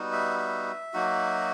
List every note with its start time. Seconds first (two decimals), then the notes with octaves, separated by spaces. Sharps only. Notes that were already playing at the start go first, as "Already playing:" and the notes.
Already playing: G3 B3 D#4 F#4
0.13 E5
0.39 E5
0.93 F#3 A#3 D#4 F#4